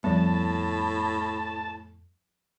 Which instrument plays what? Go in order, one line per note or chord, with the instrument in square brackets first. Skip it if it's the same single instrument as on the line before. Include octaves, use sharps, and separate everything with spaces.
[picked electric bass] F2 B3 [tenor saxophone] A2 [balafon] F3 G3 [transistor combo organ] A5